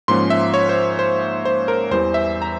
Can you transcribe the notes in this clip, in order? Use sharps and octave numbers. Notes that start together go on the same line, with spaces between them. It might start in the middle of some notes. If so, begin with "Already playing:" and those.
G#2 F3 A#3 C#4 C6
E5
C#5
C5
C5
C5
A#4
E2 E3 G3 C5
E5
A#5